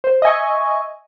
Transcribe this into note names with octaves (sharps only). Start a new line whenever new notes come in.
C5
D#5 E5 G#5 C#6